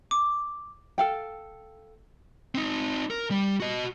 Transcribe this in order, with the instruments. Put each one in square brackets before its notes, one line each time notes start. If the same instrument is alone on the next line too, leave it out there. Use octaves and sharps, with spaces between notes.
[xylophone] D6
[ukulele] A4 F5 G5
[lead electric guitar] C4 D#4
A#4
G3
F#4 D#5